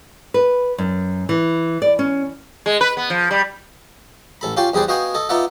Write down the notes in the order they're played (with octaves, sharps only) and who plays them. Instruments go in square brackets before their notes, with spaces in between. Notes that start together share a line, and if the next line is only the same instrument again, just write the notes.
[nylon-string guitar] B4
F#2
E3
D5
C#4
[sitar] G#3
B4
B3
F3
G3
[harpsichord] A1 A4 B5
C#4 F4 G4 F5 G5 A5
E2 G3 G#4 B4 C5 D5
B3 F#4 D#5 F5 G5 G#5
A4 D#5
B3 D#4 F4 D5 E5 F#5